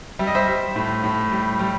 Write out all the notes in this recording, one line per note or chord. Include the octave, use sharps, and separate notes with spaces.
G3 E5
D#5
C5 E5
G3
A2
A2
G3
G3